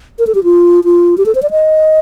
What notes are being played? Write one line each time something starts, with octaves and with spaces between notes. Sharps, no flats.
A#4
A4
G4
F4
F4
G4
A4
C5
D5
D#5